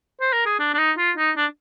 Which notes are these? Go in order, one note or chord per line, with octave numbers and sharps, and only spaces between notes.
C5
A#4
G#4
D4
D4
D#4
F4
D#4
D4